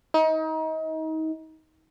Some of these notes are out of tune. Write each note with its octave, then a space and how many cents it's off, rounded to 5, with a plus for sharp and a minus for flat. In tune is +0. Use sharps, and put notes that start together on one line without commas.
D#4 +30